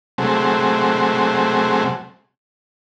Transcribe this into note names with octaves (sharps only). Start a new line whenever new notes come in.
C3 F#3 G#3 A3 C4